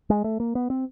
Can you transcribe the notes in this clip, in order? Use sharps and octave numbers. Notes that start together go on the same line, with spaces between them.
G#3
A3
A#3
B3
C4